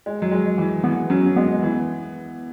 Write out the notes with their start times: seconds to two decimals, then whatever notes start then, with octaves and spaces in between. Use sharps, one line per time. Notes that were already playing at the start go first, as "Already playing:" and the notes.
0.06 G#3
0.22 F#3
0.32 G#3
0.58 E3
0.84 E3 B3
1.10 F#3 C#4
1.36 G#3 B3
1.63 E3